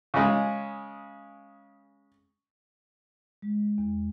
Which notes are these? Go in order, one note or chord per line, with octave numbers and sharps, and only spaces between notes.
C#3 G#3
G#3
E2